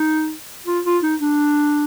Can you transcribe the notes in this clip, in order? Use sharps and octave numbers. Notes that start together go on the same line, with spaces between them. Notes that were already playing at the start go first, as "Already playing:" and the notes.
Already playing: D#4
F4
F4
D#4
D4